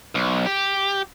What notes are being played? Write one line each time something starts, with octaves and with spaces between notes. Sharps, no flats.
B1
G4